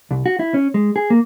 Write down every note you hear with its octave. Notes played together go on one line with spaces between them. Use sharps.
C2
F#4
E4
C#4
G#3
G#4
A#3